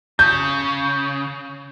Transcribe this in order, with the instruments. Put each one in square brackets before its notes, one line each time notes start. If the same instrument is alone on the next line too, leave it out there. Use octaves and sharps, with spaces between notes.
[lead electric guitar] C#3 [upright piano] G6